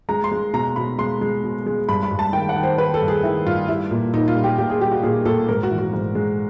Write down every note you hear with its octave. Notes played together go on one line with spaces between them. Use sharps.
G#3 A#5
C6
G#3
B2 A#5
B2 B5
G#3 C6
G#3
B2
G#3
G2 B5
B5
G2
A5
D#3 G5
F#5
D#3
C5
D#3 B4
A4
G2
G#4
D#3 E4
G2 F4
G3 E4
A#2
A#2 D#4
F4
G3
G4
A#2 G4
G#4
G3 G4
F#4
A#2 G#4
A#2 A4
G#2 A#4
F#4
E3
F#4
G#2
G#3